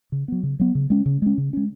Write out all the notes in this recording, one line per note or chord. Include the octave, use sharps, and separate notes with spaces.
C#3
F#3 B3
C#3
F#3 B3
C#3
G#3 C#4
C#3
G#3 C#4
C#3
G#3 C#4